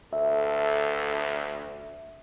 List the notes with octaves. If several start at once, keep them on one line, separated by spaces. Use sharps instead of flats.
D2 A4 E5